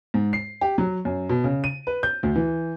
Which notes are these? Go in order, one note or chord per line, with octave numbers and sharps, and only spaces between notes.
G#2
C7
G4
F#3
F#2
B2
C#3
D#7
B4
G6
D2
E3